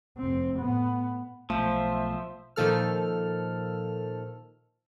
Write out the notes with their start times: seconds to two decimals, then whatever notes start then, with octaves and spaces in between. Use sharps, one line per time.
0.18 F1 C4
0.59 A2 B3
1.50 B1 F3 A3 C5 E5
2.56 A#2 D#3 F3 A4 F6